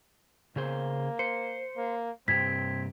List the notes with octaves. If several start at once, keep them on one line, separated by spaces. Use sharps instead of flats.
C#3 A#3 G#4 C5
C5 C#7
A#3
G2 C3 C4 G4 G#6 B6